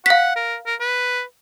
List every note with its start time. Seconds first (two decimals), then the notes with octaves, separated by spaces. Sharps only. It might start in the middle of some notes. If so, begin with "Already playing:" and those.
0.06 F5 F#5 B6
0.36 A#4
0.66 A#4
0.80 B4